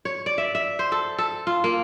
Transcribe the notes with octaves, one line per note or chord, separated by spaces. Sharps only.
C#5
D5
E5
E5
C5
A4
A4
F4
A#3